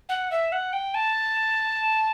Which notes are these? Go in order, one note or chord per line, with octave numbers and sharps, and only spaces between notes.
F#5
E5
F#5
G5
A5